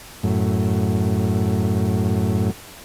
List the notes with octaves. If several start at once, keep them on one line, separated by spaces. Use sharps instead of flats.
F#2 A2